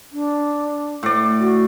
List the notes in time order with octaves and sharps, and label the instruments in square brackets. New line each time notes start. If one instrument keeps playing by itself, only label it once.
[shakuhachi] D4
[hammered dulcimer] A2 D5
[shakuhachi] F#4